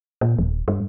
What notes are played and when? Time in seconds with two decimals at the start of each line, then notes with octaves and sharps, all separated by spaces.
0.21 A#2
0.39 D#1
0.68 G2